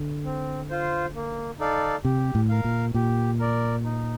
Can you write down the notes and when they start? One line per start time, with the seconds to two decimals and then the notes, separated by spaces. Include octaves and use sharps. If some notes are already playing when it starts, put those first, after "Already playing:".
Already playing: D3
0.25 C4
0.70 F4 C5
1.15 A#3
1.60 D#4 A4 D5 F5
2.04 C3 G4
2.35 A2
2.49 A#4 F5
2.64 A#2
2.94 A#2 G4
3.40 A#4 D5
3.84 D#4